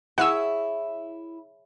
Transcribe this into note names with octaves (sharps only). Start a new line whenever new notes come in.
E4 G#4 C#5 F#5 G#5 E6